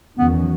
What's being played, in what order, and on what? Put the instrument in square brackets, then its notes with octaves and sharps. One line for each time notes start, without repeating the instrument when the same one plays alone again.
[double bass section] E2 D#3 F#3 C#4 [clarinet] B3